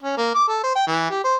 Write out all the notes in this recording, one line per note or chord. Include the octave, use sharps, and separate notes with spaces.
C#4
A#3
D6
A4
C5
G5
E3
G4
C5